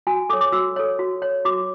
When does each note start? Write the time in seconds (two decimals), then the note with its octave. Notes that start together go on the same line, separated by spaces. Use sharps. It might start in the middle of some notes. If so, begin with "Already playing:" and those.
0.07 F#4 G#5
0.29 A4 D6
0.33 C#5
0.41 D6
0.53 F#4 E6
0.76 A4 C#5
0.99 F#4
1.22 C#5
1.45 F#4 D6